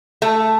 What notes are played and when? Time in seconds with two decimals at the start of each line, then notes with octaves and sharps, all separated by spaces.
0.22 A3